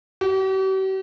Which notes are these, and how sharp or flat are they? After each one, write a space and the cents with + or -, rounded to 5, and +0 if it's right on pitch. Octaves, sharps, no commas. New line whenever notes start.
G4 -45